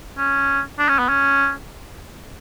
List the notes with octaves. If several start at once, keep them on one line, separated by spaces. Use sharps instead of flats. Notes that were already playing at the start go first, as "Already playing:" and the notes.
C#4
D4
C#4
B3
C#4